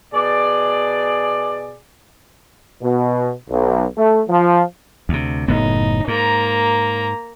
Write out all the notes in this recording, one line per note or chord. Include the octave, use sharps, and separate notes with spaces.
B2 G#4 D5
B2
B1
A3
F3
D2 C3
F#1 A2 B3 D#4
G#2 A#3 A#5